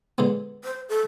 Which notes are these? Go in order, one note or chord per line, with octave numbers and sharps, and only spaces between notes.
D3 G#3 B3
C5
A4